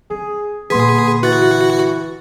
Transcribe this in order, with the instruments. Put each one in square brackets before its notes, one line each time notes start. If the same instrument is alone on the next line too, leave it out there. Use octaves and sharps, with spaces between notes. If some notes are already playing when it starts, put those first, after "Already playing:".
[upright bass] C4 [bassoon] G#4
[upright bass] A#2 D3 [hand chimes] A#3 C6 B6 [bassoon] B3 [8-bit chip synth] G#4
[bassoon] E3 [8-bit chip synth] F#4 [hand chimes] F#6 A6